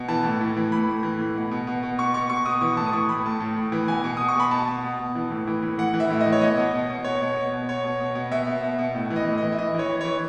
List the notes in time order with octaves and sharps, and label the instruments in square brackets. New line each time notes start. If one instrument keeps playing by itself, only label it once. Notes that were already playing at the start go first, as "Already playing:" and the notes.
Already playing: [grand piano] B2
E3 A5
A2
A2
E3
A2 B5
A2
E3
A2
B2
B2
B2
B2
B2 C#6
B2 C#6
B2 C#6
B2 D#6
E3 C#6
A2 A5
D#6
E3 C#6
A2 B5
A2 A5
A2
A2
E3
B2 G#5
B2
B2 D#6
C#6
B2 B5
B2 A5
B2
B2
B2
E3
A2
E3
A2
E3 F#5
E3
E5
A2
D#5
E3
C#5
B2 D#5
B2
B2
B2
B2 C#5
B2
B2
B2
B2 C#5
B2
B2
B2
B2 E5
B2
B2
B2
A2
E3
D#5
A2
D#5
E3
E5
E3 D#5
E3 C#5
E3
E3 C#5